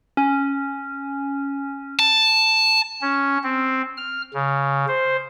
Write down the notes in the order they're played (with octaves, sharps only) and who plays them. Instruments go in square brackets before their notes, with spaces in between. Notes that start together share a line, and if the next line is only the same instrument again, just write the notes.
[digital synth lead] C#4
[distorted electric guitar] A5
[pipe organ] C#4
C4
F6
C#3
C5